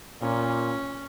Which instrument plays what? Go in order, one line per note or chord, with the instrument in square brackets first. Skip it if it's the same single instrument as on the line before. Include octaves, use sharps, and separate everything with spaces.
[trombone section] A#2 [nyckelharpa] C#4